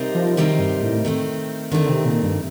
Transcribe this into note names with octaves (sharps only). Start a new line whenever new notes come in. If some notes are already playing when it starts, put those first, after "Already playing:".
Already playing: C3 G3 C4 D#4 A#4
F3
C3 D#3 G3 C4 D#4 A#4
G2
A2
D#3 A3 C4
D3 D#3 A3 C4
C3
A#2
G2